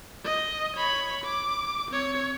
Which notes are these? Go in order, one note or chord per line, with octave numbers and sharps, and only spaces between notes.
D#5
C#5 B5
D6
C4 C#5